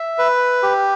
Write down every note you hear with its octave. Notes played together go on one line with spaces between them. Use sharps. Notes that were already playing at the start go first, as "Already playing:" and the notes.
Already playing: E5
B4
G4